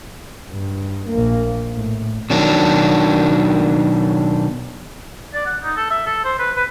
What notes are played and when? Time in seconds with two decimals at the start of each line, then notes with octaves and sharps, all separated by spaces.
0.49 G2
1.08 A#1 A#3
1.74 A2
2.30 B2 D#3 F#3 D4
5.34 D5
5.46 F#5
5.63 D#4
5.77 A4
5.90 E5
6.06 A4
6.25 C5
6.39 B4
6.56 B4